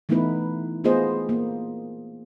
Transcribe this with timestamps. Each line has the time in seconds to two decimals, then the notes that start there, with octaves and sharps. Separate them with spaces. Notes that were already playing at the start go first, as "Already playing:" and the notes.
0.09 E3 A3 B3 D#4 E4 B4
0.84 A3 B3 F4 G#4 C5 D#5
1.29 A#3